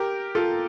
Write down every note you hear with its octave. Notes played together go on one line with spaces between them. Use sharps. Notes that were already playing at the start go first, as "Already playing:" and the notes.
Already playing: G4 A#4
F4 A4